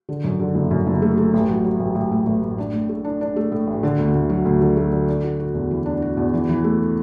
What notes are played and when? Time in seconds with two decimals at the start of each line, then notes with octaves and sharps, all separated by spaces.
0.09 D3
0.24 F#2
0.40 D3
0.55 F#1
0.71 F#2
0.87 F#1
1.02 A3
1.17 A3
1.34 A1
1.49 F#3
1.64 F#3
1.80 A1
1.95 A1
2.12 A2
2.27 A1
2.43 A2
2.58 D4
2.73 A2
2.89 A3
3.05 D4
3.21 D4
3.36 A3
3.52 A2
3.67 A1
3.83 D3
3.99 D2
4.15 D2
4.30 F#3
4.45 D2
4.61 D3
4.77 A3
4.92 D3
5.08 D4
5.24 F#4
5.40 F#4
5.54 E2
5.71 E3
5.86 D4
6.02 F#4
6.17 E2
6.34 E3
6.49 E3
6.64 A3